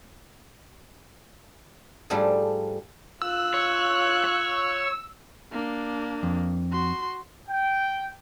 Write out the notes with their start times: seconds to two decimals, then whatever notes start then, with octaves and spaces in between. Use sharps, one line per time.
2.10 G#2 F3 G3 A3 D4 G#4
3.22 F4 E6 F#6
3.54 C#5 E6
4.25 C#5
5.52 A#3 D4
6.23 F2
6.72 F#4 C6
7.48 G5